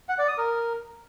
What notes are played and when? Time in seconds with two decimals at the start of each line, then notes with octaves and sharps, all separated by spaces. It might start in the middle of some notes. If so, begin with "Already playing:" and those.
0.09 F#5
0.18 D5
0.28 D#6
0.38 A#4